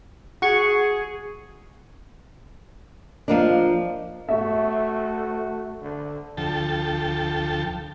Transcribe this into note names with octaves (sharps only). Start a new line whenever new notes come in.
F#4 G#4 C#6
F3 A#3 D4 D#5 F5
A3 F#4 E5
D3
D2 F3 A4 G5 A5